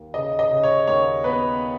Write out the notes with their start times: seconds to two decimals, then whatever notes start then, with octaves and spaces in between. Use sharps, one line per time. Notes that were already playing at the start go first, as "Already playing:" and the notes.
Already playing: D#2
0.14 C#3 D#5
0.39 D#5
0.51 C#3
0.63 C#5
0.87 D#2 C#5
1.24 B3 B4